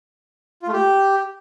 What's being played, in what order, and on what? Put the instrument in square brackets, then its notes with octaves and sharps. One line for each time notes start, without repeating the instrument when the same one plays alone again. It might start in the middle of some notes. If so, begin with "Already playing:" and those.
[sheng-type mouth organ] F4
A3
G4